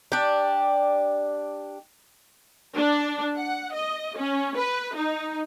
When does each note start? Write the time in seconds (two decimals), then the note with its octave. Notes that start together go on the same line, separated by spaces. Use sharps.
0.12 D4 G4
2.75 D4
3.37 F#5
3.73 D#5
4.17 C#4
4.57 B4
4.94 D#4